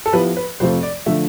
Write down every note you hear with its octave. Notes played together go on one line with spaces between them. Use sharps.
A4
F3 B3 E4 G4 B4
B4
F2 C3 F3 A3 C5
D5
D3 F3 A3 E5